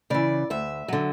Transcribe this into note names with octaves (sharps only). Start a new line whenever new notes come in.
C#3 E3 D5
D2 E5
D3 F#3